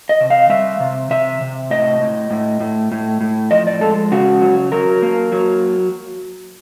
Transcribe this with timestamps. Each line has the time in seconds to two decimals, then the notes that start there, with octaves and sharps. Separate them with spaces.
0.09 D#5
0.21 C3
0.30 F5
0.49 G3 E5
0.80 C3
1.11 C3 E5
1.41 C3
1.70 A2 D#5
2.01 A2
2.31 A2
2.60 A2
2.92 A2
3.21 A2
3.51 F3 D#5
3.67 D5
3.81 G#3 A4
4.12 C#3 F#4
4.42 F#3
4.72 F#3 A#4
5.02 A#3
5.32 F#3